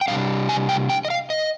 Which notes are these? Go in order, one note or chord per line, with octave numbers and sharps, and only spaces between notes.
G5
C3 D#3 G3 D4 F5
G#5
G5
G5
D#5
F5
D#5